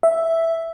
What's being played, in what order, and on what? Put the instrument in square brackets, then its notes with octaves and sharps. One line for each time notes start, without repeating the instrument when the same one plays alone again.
[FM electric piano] E5